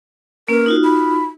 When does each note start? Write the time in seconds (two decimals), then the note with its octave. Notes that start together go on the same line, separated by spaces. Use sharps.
0.48 A#3 C#4 A#4 B4
0.66 D#4 F4 F#4
0.84 B5